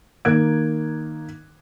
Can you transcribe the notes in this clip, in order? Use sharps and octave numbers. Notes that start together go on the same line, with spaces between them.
D#3 A#3 F#6 G#6 D7